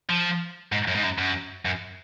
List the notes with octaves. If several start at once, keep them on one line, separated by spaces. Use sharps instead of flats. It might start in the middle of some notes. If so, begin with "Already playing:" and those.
F3
G#2
F#2
G#2
F#2
F#2
F#2